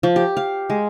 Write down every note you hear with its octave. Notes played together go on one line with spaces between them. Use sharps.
F3
G4
F5
G#3